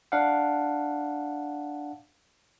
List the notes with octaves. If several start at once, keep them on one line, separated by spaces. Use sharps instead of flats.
D4 F5 F#5